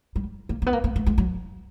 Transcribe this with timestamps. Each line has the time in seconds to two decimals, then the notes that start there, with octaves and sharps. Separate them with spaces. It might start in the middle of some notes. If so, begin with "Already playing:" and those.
0.16 G3
0.49 A#3
0.62 A#3
0.66 B3
0.73 A#3
0.84 A#3
0.96 A3
1.06 G#3
1.18 F#3